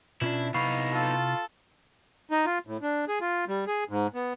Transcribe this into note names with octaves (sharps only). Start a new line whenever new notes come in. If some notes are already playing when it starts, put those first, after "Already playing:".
B2 C#4 D4 E4 F4
C3 B3 D#4 E4 F5 B5 C#6 C7
F4 A4
D#4
F4
A2
D4
G#4
F4
G3
G#4
G#2
B3